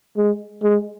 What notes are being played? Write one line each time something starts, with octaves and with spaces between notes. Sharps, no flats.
G#3
G#3